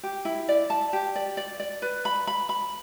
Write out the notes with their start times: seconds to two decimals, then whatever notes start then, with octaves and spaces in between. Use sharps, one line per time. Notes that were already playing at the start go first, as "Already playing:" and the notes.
0.03 G4
0.25 E4
0.49 D5
0.70 A5
0.93 G4
1.16 D5
1.37 D5
1.60 D5
1.82 B4
2.05 B5
2.27 B5
2.49 B5